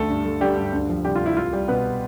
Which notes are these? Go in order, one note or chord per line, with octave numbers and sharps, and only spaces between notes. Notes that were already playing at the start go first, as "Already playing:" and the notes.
Already playing: D2 A3 A4
G2
A3
D3 G3 G4
G2
D2
F3
C3 G3 G4
F4
A3
E4
C2 F4
G3 G4
B2 B3 B4